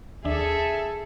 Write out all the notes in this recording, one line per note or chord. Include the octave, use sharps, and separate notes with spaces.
D#2 D4 G#4 A4 E5